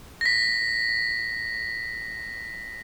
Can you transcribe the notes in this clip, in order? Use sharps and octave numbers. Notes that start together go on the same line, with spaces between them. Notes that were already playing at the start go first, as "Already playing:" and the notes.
A#6 B6